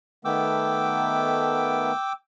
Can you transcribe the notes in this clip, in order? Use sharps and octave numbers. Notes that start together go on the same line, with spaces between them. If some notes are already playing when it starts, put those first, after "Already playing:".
D#3 A3 B3 G5 D6 E6